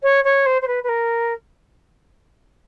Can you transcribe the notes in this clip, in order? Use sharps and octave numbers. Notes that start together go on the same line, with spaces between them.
C#5
C#5
C5
C5
B4
B4
A#4